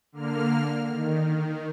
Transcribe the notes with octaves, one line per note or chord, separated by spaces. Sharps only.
D3 A#3 F6
D#3